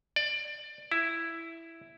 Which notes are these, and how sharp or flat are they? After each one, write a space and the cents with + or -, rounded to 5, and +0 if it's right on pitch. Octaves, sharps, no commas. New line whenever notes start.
D5 +20
E4 +5